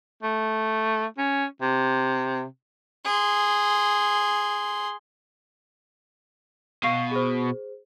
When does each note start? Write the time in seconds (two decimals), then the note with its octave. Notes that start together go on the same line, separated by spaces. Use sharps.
0.23 A3
1.18 C#4
1.62 C3
3.05 G#4 C6
6.83 B2 F5 C#6 C7
7.11 G#4 C5